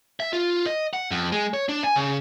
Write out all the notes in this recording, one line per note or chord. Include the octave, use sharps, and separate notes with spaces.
E5
F4
D#5
F#5
F2
G#3
C#5
D4
G#5
C#3